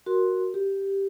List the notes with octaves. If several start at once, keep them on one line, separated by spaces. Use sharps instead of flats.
F#4 A#4 C6
G4